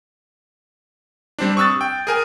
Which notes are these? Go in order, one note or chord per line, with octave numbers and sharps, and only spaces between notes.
G3 C4 D4
C#6 D#6 E6 F#6 A6
G5
G#4 A#4 G#5